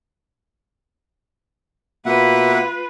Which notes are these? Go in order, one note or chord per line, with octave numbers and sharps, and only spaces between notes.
B2 A#3 F4 B4 E5 F#5